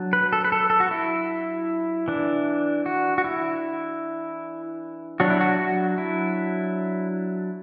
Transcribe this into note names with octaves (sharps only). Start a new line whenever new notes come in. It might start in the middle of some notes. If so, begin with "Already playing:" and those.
Already playing: F#3 D4
B4
A4
B4
A4
A4
F#4
E4
E3 D4
F#4
F#4
E4
F#3 D4 F#4
E4
F#4
F#4
E4